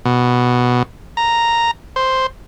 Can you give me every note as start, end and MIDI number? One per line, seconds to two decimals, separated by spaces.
0.05 0.83 47
1.17 1.71 82
1.96 2.27 72